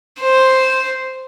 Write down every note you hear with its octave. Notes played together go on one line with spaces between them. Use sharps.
C5